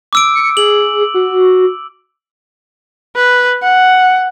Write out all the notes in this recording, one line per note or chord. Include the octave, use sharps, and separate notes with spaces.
D6 E6 D7
C#7
G#4 F#7
F#4
B4
F#5